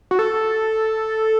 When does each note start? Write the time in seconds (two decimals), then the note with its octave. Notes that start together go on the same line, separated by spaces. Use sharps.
0.11 F#4
0.19 A4